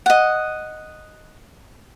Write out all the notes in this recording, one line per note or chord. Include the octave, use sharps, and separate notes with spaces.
D#5 F#5